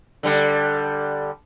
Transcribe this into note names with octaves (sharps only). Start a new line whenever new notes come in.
D3 G3